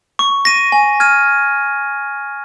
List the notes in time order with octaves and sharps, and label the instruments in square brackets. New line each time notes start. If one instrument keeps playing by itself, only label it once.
[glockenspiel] C#6
A#6 D#7
G#5
F6 G#6 D#7